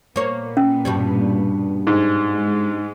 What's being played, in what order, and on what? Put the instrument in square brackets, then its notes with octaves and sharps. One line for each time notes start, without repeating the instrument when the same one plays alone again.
[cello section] A#2 B3 [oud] A#3 C#5
[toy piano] C#4
[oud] G2 B2 G3
[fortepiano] G#2
[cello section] G#3